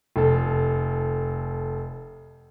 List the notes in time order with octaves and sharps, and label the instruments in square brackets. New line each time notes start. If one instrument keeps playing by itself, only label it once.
[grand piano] F1 A4